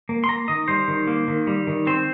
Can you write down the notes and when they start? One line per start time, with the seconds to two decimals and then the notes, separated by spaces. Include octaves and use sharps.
0.09 A#3
0.24 C6
0.28 A#3 A#5
0.48 D#3 D#5
0.68 G3 C5
0.88 D#3
1.07 A#3
1.28 D#3
1.47 G3
1.67 D#3
1.87 C4 C5